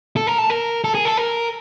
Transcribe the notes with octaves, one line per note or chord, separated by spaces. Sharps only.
A4
A#4
A4
A#4
A4
G#4
A4
A#4